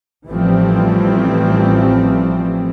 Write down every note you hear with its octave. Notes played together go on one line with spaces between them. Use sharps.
A1 E3 F3 G3 A3 C4